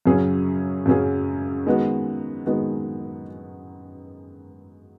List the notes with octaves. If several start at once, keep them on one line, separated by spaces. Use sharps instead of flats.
F#2 C#3 F#3 C#4 G#4
F#2 C#3 F#3 C#4 G#4
D#3 G#3 B3 F#4
D#3 G#3 B3 F#4